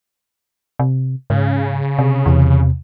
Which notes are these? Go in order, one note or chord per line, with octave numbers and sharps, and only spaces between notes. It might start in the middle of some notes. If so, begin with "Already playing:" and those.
C3
G#2 C#3
C3
E2 C3 E3